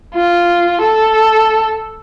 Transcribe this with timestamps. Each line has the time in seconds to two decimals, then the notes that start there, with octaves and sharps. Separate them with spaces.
0.15 F4
0.82 A4